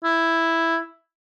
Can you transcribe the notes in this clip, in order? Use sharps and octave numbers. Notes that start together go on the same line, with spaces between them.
E4